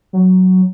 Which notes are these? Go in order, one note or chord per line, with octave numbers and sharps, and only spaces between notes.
F#3